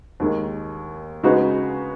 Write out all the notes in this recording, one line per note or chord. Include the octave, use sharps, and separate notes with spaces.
D#2 D#3 G#3 D#4
C#3 G#3 D#4 F#4 B4